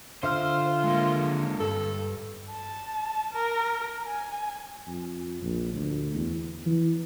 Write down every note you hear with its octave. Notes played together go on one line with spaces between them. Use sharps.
D3 F4 C5 E5 F6
G#3 A#3
G2 A4
A5
A#4
G#5
F2
A#1
D2
E2
E3